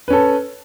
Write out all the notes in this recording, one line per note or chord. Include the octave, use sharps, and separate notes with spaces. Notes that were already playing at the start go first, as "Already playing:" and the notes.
C#4 A4 B4